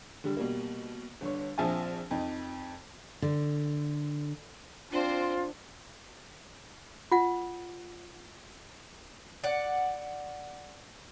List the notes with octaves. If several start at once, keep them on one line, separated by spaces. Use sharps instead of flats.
D3 G3
B2 G3 A#3
G1 D3 C#5
A#1 F3 C4 E5 G#5 A5
F2 D#4
D3
C4 D4 F4 C5
F4 F#5
D5 F#5